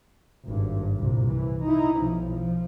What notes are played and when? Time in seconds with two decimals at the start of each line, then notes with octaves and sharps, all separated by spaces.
0.45 G#1 G2
0.97 C2 A#2
1.31 E3
1.63 D#4 E4
2.00 B1 F3
2.32 F3